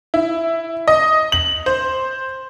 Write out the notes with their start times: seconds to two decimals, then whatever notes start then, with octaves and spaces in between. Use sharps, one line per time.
0.14 E4
0.88 D#5
1.32 F#7
1.66 C5